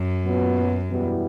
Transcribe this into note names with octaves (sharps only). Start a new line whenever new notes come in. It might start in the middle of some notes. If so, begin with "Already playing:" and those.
Already playing: F#2
A#2 F#3 B3
E2 B2 G3 B3 E4